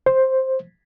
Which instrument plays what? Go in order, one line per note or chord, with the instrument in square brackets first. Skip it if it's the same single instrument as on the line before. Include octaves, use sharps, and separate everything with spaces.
[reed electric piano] C5